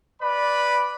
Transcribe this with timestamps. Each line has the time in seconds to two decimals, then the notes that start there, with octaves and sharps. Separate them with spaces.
0.21 B4 D5 B5